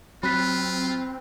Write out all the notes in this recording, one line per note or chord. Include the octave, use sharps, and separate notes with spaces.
F#3 C4 F4 B5 F#6 B6